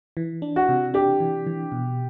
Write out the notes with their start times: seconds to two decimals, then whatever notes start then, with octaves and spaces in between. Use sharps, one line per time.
0.17 E3
0.42 D4
0.56 F#4
0.69 C3
0.94 D4 G4
1.20 E3
1.47 E3
1.72 B2